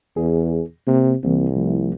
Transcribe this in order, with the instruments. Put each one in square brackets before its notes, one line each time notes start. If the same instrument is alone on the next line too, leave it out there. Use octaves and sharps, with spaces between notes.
[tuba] E2 [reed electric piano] G#4
[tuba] C3 [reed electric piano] A#3
[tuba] C2 [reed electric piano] E3 A#3 C4
[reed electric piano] F3 A3 E4